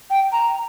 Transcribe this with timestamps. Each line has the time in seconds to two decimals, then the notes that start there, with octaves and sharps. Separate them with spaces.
0.10 G5
0.32 A#5